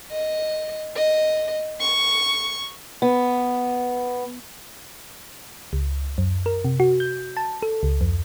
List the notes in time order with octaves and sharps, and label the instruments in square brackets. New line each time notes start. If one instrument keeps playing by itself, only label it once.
[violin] D#5
D#5
C#6
[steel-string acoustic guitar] B3
[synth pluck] C#2
F#2
A#4
C3
F#4
G6
A5
A4
C#2
F2